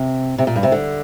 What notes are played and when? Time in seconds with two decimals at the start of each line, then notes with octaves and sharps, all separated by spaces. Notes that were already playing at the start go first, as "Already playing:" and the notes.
Already playing: C3
0.38 C3
0.47 A#2
0.56 G2
0.63 C3
0.72 D3